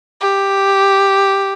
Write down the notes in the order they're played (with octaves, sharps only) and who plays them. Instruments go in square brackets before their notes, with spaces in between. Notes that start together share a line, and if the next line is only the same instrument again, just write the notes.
[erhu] G4